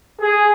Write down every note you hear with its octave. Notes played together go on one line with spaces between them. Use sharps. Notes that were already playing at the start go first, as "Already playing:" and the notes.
G#4